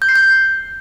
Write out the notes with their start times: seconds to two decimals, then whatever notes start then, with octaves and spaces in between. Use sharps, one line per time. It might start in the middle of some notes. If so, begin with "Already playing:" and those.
0.02 G6
0.09 C7
0.16 G6